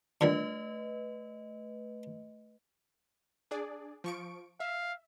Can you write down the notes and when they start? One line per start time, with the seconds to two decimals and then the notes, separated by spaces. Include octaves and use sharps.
0.21 A#2 D3 G3 A3 B4 D#5
3.51 D4 G#4 D5
4.04 F3 C#6 D7
4.60 E5 F5